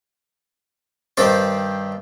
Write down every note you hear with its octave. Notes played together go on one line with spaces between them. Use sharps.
G2 D#3 C4 G4 C5 A5